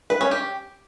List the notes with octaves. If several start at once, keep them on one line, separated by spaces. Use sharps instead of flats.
B4
C#4
G4